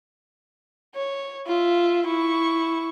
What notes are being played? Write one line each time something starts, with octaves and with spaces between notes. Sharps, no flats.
C#5
F4 E5
E4 C#6